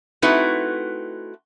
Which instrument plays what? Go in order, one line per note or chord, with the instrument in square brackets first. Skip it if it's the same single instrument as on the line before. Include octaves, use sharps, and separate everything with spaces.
[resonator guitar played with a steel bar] A3 C4 D#4 E4 F#4 B4